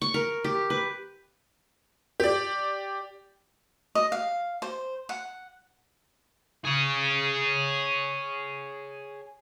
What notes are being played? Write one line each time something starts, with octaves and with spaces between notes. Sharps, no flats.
C#6
A#4
G4
B4
G4 D5
D#5
F5
C5
F#5
G#4 C#5